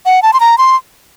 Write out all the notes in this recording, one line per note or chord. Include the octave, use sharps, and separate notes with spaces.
F#5
A5
C6
A#5
C6